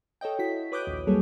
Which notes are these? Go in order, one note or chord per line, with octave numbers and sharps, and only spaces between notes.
A4 C#5 D#5 G5
E4 F#4 B6
B4 C#5 D6 D#6 F#6 G6
A#1 D#2
F#3 G3 A#3 G#4 A4 C#5